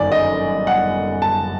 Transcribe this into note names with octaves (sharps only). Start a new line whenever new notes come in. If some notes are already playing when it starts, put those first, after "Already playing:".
Already playing: G1 F#2 D#3 D5
D#5
F#5
A5